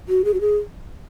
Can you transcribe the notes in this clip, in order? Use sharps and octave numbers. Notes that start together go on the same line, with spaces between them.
F#4
G#4
F#4
G#4